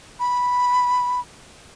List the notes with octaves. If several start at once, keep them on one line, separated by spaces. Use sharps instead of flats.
B5